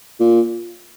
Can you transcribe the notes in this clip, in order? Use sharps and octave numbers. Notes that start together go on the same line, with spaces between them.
A#2